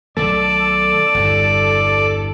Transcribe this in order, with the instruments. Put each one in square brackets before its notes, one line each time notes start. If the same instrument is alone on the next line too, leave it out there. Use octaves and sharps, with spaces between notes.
[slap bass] B1 D#3 A3 [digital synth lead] A4 [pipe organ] D5
[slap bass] G1 E2 G2